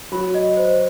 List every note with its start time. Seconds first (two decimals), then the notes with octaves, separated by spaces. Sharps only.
0.12 F#3 B5
0.34 D#5
0.57 C5